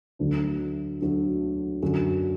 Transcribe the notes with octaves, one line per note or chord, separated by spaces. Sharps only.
D2 D3 F#3 A3 D4
D2 D3 F#3 A3 D4
F#2 D3 F#3